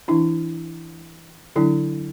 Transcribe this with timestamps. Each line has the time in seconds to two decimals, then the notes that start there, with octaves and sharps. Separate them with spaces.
0.08 E3 D4 E4
1.56 D3 F#3 D4 E4